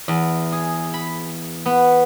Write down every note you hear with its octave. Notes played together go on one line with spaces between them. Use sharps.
E2
G#4
B5
B3